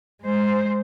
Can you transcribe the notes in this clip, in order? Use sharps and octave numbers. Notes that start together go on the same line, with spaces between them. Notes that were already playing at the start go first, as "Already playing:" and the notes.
G#3 C5